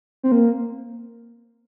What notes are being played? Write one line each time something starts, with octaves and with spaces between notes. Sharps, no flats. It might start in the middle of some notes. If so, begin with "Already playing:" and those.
C4
A#3